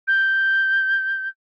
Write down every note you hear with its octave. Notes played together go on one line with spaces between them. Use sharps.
G6